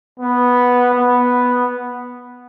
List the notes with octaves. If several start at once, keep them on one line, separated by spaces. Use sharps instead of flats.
B3
B3